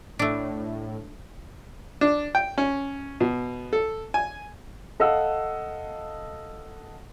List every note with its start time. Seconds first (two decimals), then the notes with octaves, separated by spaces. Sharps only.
0.19 A2 A3 D4
2.01 D4
2.35 G5
2.58 C#4
3.21 B2
3.73 A4
4.14 G#5
5.00 A4 D#5 F5 F#5 E6